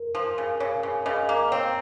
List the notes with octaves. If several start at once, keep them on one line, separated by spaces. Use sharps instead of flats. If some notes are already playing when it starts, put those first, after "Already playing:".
Already playing: A#4
F3
C#3
C#3 C#5
C#3
C#3 D#5
A#3
C4 C#5